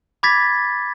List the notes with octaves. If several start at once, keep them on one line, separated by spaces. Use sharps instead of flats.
B5 D6 G#6 A6 B6